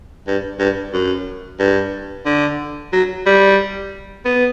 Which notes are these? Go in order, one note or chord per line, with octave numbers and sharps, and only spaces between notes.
G2
G2
F#2
G2
D3
F#3
G3
B3